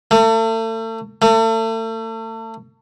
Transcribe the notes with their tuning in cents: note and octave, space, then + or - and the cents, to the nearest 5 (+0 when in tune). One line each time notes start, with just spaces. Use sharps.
A3 +35
A3 +35